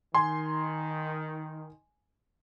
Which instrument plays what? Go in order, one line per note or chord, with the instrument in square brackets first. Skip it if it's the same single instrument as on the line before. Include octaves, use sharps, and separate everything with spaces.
[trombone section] D#3 [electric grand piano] G#5 C6